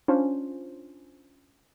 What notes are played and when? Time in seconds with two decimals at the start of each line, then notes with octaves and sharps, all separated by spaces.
0.08 C#4 D4 F4 C5